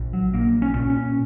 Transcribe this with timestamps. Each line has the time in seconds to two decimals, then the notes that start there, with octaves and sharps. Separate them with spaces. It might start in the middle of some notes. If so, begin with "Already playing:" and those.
Already playing: A#1
0.13 F#3
0.34 A#1 A#3
0.62 C#4
0.75 A#2
0.90 C#4